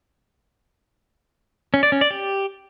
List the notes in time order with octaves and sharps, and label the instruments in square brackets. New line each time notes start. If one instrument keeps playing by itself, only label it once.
[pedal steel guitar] C#4
D5
C#4
D5
G4